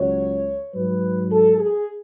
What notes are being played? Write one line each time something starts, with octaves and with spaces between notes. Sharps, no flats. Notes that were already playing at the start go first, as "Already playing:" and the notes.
Already playing: C#2 C#3 F#3 C#5
G#2 F#3 B4
A4
G#4